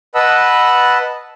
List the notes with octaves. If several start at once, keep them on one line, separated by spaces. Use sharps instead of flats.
B4 D#5 F#5 A5 B5 E6